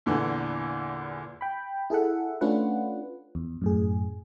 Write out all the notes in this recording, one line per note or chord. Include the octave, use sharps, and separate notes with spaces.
E2 A#2 D3 E3
G5 B5
E4 G#4 A4 E5 F#5
A3 C#4 D4 F4 B4 F#5
E2
F#2 A2 G#4